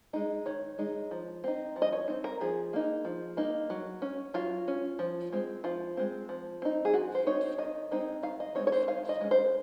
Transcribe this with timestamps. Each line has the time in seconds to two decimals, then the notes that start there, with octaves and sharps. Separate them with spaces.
0.13 G#3 D#4
0.46 D#3 C#5
0.78 G#3 D#4
1.11 F3
1.44 C4 D#4
1.76 F3
1.82 D#5
1.92 C#5
2.08 C4 D#4
2.24 A#4
2.41 F3 G#4
2.73 A#3 D#4
3.05 F3
3.37 A#3 D#4
3.70 F#3
4.02 C#4
4.34 F#3 F4
4.68 C#4
4.99 F3
5.33 G#3 C4
5.64 F3 F4
5.97 G#3 C4
6.29 F3
6.62 C4 D#4
6.85 G#4
6.94 F3 F#4
7.15 C5
7.26 C4 D#4 C#5
7.58 D#3 D#5
7.91 G#3 C4 D#4
8.23 D#3 F5
8.40 D#5
8.55 G#3 C4 D#4 C#5
8.67 C#5
8.72 C5
8.88 D#3 F5
9.09 D#5
9.21 G#3 C#4
9.31 C5